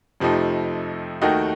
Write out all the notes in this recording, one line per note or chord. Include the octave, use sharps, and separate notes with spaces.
F2 C3 F3 A3 D#4
D#2 D#3 A3 D#4 F#4